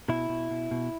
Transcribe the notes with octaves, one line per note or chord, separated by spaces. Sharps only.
B2 E4
B2
B2
B2